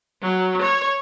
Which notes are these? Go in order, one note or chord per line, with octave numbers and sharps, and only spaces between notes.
F#3
C#5